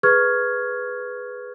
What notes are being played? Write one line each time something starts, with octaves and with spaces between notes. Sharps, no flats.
G#4 B4 C#6 F6 G#6